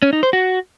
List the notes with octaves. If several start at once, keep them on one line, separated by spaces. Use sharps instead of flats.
C#4
D#4
C5
F#4